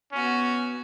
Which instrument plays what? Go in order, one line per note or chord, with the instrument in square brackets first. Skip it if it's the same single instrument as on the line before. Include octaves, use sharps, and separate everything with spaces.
[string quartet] B3 F#4 [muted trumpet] C#4